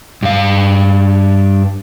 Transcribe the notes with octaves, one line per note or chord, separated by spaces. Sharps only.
G2 F5